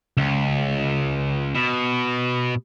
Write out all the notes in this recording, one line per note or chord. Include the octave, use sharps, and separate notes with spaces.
C#2
B2